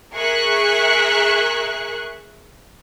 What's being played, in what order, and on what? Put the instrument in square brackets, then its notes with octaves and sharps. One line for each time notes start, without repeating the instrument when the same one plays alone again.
[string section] G#4 A#4 E5 C#6 F#6